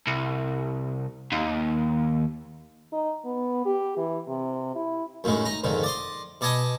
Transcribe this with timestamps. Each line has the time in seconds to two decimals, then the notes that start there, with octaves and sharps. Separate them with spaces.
0.07 C2
1.32 D#2
2.92 D#4
3.25 B3
3.66 G4
3.97 E3
4.28 C3
4.75 E4
5.24 F#2 A2 D#3 G#3
5.45 D#4 A#5
5.64 F2 G#2 D3 D#3
5.83 D5 D#5 C6
6.41 B2 D5 D#5 G#5 A5 D#6